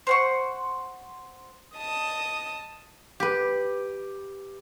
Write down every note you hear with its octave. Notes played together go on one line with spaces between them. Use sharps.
C5 F#5 C#6
D#5 A5 D#6
G4 B4